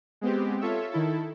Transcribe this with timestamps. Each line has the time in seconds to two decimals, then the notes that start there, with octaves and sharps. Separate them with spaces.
0.21 G#3 B3 C4 G4
0.61 F4 A4 C#5 E5
0.91 D#3 E4 A4